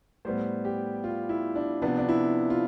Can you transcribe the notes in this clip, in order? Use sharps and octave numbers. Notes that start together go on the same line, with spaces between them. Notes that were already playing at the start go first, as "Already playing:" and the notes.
A2 G3 B3 C5
G4
F4
E4
D4
C3 F3 B3 D4
D4
E4
F4